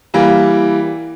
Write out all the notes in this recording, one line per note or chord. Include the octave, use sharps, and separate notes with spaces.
E3 G3 A#3